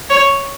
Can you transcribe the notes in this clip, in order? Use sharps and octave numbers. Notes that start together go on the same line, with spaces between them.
C#5